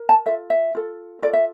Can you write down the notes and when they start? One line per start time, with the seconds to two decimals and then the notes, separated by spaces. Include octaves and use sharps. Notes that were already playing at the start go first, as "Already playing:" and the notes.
Already playing: A#4
0.09 A5
0.26 F4 A4 E5
0.50 E5
0.75 F4 A4
1.22 F4 A4 D5
1.33 E5